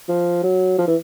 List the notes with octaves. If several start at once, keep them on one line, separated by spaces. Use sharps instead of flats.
F3
F#3
F3
E3